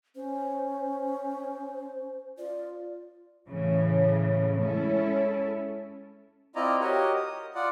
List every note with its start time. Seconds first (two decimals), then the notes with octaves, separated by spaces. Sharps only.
0.16 C#4 C5
2.38 F4 D5
3.49 A2 C#3 E3
4.61 G#3 C#4 E4 A4
6.55 C4 E4 F4 D5 D#5 A#5
6.80 F#4 G4 A#4 C#5 D#5
7.16 D#6
7.55 F4 D5 F#5